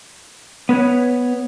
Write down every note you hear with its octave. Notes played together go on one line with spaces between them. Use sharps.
B3 B4 C#5